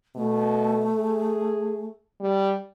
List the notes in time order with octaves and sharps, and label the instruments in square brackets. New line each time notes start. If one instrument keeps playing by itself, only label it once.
[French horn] B2 [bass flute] A3
[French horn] G#4
G3